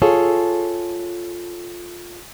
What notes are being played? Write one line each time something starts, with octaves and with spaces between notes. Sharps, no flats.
F4 G#4 A4 C#5